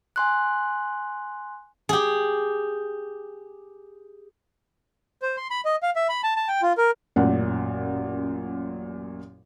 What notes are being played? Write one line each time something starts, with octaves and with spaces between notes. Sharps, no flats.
G#5 C6 F#6
G4 G#4
C5
C6
B5
D#5
F5
E5
B5
A5
A5
G5
F4
A#4
A1 F#2 A#2 F#5